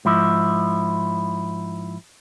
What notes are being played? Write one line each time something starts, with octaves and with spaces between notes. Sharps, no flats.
G#2 F3 E4